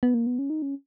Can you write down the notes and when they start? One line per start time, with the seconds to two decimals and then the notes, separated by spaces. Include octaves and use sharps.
0.03 B3
0.14 A#3
0.27 B3
0.39 C#4
0.50 D#4
0.62 C#4